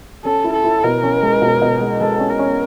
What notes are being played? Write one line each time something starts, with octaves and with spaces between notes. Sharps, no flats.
C#4 A4
E4
A4
E4
B2 A#4
C#4
G#3
B2
B2
G#3
G#3 A4
C#4
A#4
C#4